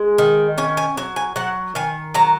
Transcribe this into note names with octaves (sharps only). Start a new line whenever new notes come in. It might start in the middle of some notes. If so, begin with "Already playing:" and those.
Already playing: G#3
D#3
C#4 G#5
G#5
F#3 G#5
G#5
F#3 F#5
D#3 G#5
F#3 A#5